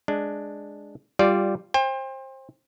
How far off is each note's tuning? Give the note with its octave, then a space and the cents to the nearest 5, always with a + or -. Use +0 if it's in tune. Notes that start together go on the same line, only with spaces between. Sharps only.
G#3 +0 D4 +0
G3 +0 F4 +0 D5 -5
C5 +25 G5 +35